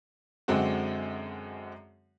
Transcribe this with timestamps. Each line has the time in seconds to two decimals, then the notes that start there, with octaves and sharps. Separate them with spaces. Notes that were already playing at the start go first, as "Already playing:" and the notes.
0.48 F#2 D3 G#3 C4 F#4